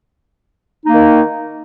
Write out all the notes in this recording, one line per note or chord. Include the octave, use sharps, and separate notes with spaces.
D#3 A#3 D#4